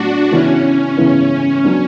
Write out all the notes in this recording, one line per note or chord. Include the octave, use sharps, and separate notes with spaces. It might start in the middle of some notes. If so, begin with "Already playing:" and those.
Already playing: A2 F#3 B3 D4 F#4
C#3 E3 B3 C#4 E4
C#3 E3 B3 E4
F#3 B3 D4